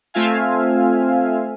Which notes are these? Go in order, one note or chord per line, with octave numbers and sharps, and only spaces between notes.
A3 C4 F4 E5 F5 G#5